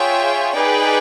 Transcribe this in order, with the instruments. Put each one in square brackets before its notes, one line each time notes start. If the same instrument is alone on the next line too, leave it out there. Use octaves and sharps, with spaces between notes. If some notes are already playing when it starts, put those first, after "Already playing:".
Already playing: [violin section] F4 G#4 C#5 E5 G5
D#4 G#4 B4 D5 G5